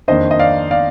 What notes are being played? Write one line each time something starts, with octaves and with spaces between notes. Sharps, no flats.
F2 D#3 A#3 D4 C5 D#5
D#5
D5 F5
D5 F5